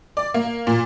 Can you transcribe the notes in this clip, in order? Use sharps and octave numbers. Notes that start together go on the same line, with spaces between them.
D5
A#3
A#2